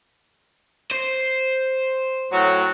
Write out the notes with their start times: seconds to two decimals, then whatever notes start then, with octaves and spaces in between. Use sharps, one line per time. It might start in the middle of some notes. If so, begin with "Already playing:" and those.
0.92 C5
2.31 A2 F#3